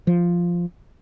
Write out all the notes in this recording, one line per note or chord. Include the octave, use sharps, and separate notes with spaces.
F3